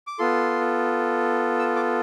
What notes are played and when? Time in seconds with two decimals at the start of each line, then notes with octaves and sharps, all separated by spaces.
0.07 D6
0.19 B3 F4 A4 C6
1.59 E6
1.76 D6